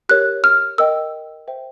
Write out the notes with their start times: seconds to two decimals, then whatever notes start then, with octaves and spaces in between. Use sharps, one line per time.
0.09 G4 A#4 C#5 F#6
0.44 F6
0.78 A#4 D#5 G5 E6
1.48 C5 E5 G5